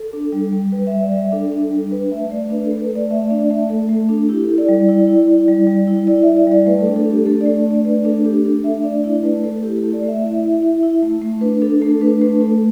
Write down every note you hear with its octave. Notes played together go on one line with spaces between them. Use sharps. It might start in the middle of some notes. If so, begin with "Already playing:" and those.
Already playing: A4
D4
G3
G3
G3 B4
G3 E5
D5
G3 E5
D4 A4
D4
G3
D4 B4
A3 E5
A3 D5
D4 B4
A4
A3
B4
A3
D5
A3 E5
D4 D5
A3 E5
A3 A4
A3
D4
E4 G4
A4
E4
D5
G3
D5
E4
E4
E4
G3
G3
E4
E4 D5
E4 E5
D5
G3 D5
A3 B4
A4
D4
A4
D4 G4
A3 A4
A3 D5
D5
D4 D5
A3 B4
D4 A4
D4 G4
D4 A4
A3 E5
D4 D5
E4 D5
A3 B4
A3 A4
E4 G4
A3 A4
D5
A3
E5
E4
E4
E4
E4
A3
A3
D4 B4
D4 A4
A3 A4
D4 B4
A3 B4
A3 A4